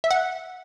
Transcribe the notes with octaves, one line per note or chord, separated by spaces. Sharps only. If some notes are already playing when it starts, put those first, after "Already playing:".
E5
F#5